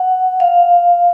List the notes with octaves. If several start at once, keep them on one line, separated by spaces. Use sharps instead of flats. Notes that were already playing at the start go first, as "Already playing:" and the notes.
Already playing: F#5
F5